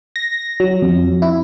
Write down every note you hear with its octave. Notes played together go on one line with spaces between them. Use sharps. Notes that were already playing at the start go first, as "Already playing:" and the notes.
A#6
F#3
F2
E4